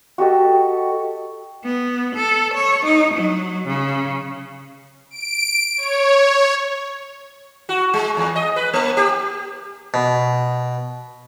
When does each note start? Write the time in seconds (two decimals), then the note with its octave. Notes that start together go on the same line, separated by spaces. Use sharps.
0.18 F#4 G4 A4 D#5
1.64 B3
2.16 A4
2.54 C#5
2.86 D#4
3.14 F#3
3.68 C#3
5.10 D7
5.77 C#5
7.69 F#4
7.94 G#3
8.17 E2
8.36 D#5
8.56 B4
8.73 A#3
8.97 G4
9.94 B2